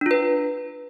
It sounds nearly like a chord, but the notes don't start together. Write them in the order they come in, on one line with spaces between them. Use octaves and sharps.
D4 F4 B4